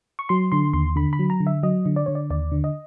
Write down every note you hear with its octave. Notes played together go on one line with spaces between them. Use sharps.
C#6
F#3 C6
D3 C6
D#2 C6
D3 B5
B5
F#3
A#5
D3
E5
F#3 D#5
D3
D5
D3 C#5
D5
D#2 D5
D3
D#5